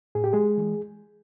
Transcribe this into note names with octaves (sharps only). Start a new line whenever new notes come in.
A2 G#4
G4
G#3 G#4
E3 G#3